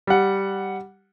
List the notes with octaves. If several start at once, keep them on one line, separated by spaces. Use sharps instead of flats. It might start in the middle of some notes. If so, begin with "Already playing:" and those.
G3 F#5